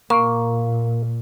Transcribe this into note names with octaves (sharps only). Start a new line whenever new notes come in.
A#2 A#3 C#6